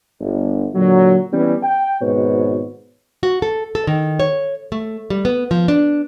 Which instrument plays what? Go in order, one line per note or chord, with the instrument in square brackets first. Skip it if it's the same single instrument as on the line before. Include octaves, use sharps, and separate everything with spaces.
[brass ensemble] G1
A#2 D3 F#3
E3 G3 B3 C#4
G5
G#1 G#2 B2 B4 C#5
[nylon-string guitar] F#4
A4
A4
D#3
C#5
A3
G3
B3
F3
D4